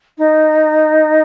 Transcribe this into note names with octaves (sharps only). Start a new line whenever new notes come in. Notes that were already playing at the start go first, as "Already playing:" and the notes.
D#4